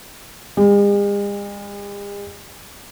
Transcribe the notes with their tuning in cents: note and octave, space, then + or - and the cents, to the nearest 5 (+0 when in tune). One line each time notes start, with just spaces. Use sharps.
G#3 -45